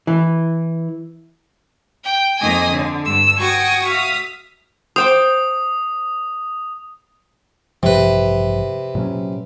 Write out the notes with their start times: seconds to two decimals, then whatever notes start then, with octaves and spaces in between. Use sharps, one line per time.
0.07 E3
2.04 G5
2.40 F2 D#3 A#3 D#5 G#5 D#6
2.70 D3
3.05 G2 E6
3.39 F#4 G5 G#5 C#6 D#6
3.87 E5 F5 D#6
4.96 C5 G5 D6 D#6
7.83 A1 G2 C3 F3 B4
8.95 A#2 F#3 C#4